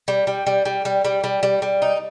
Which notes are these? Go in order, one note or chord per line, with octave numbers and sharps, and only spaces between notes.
G3
G3
G3
G3
G3
G3
G3
G3
G3
D#4